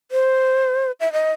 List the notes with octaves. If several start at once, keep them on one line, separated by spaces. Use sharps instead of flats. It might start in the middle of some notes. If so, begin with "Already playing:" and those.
C5
E5
D#5